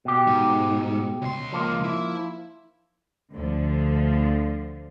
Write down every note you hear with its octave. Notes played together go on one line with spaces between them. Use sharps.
B2 G4
G#2
C#2 C6
F3 A#3
E4
D2 D3 F3